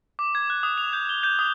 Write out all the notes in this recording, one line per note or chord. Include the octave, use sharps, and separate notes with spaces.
D6
G#6
F#6
D#6
F7
G6
G7
G6
D#6